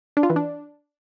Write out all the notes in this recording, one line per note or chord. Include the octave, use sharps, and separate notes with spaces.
D4
F4
E3
D4